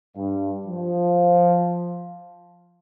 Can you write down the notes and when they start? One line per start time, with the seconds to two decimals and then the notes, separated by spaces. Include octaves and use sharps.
0.16 G2
0.66 F3